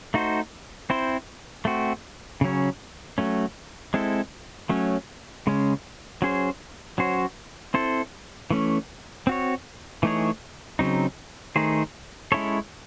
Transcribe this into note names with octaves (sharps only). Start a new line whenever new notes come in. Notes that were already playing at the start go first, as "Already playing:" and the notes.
A3 D#4 F#4 C5
C4 E4 C5
A3 C4 F#4
C#3 F#3 C#4
F#3 A3 C#4
G#3 C4 E4 A4
F#3 A3 C#4
C#3 G#3 C#4
F#3 C#4 G#4 C5
F#3 C#4 F#4 C5
C4 E4 A4 C5
E3 A3 C#4
C4 F#4 C#5
E3 A3 D#4 G#4 C#5
C#3 F#3 C4 D#4
D#3 A3 D#4 G#4 C5
G#3 C#4 E4 A4 C#5